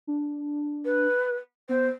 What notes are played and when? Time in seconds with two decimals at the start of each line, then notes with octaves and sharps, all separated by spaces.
0.07 D4
0.85 B4
1.69 B3 C5